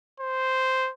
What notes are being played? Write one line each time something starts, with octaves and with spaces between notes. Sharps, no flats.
C5